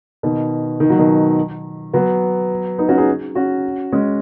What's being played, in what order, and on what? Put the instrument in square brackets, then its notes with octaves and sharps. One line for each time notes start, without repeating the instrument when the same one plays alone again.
[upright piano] B2 D#3
D#3
F#3
B2 D#3
F#3 B3
B3 D#4
C#4 F#4
D#4 G#4
C#4 F#4
G#3 C#4